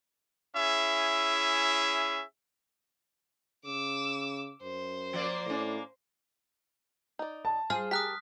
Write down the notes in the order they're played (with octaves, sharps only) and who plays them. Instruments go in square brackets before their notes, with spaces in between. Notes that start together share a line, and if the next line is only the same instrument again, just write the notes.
[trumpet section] C#4 E4 G#4 E5
[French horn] C#3 [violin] D6 E6
[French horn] F#2 [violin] C5
[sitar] F3 A#3 D5
[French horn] A2 [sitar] A#3 C#4
[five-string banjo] D#4 D5
[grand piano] A5
[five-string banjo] F4 C5 [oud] G#4 [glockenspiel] F6
[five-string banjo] G4 A#4 [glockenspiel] D#6 F#6 B6